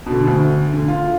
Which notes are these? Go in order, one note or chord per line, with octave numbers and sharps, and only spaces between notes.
B2 D3
D2
D3
F4